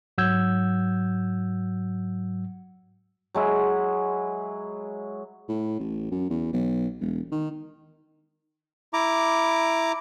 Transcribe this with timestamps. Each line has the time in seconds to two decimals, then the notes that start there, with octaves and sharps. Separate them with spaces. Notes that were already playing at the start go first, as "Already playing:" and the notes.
0.18 G#2 F#3 F#5 E6 G6 G#6
3.35 F#3 G#3 E4
5.49 A2
5.79 A1
6.11 F#2
6.30 E2
6.53 B1
7.00 E1
7.31 D#3
8.93 E4 A#5 D6